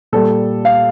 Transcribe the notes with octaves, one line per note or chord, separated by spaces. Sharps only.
A#2 G3 A4
F5